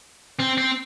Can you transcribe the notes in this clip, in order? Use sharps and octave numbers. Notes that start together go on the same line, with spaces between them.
C4
C4